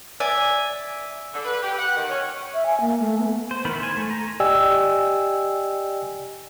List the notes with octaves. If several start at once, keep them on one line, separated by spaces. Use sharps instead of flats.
D5 E5 G#5
D3
B4
G4
F#5
D#3
C#4
E5
G#5
A#3
A3
B3
C5
D#3 E3 B3 A#4 B5
C5 G#5
A3
A#5
G4 D5 D#5 G5 G#5 E6